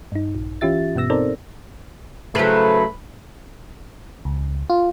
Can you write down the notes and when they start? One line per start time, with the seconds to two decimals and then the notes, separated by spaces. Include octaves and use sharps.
0.12 G2 D#4
0.35 A#1
0.61 E3 C#4 F4 G4 E5 A6
0.95 G2 B2 B3 E6 A#6
1.10 C4 D#4 A4 A#4 C5 D5
2.35 A2 C#3 F#3 A3 A4 B4 C5
4.25 C#2
4.70 F4